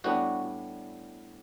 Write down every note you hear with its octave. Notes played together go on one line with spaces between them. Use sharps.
A2 G3 B3 D4 F#4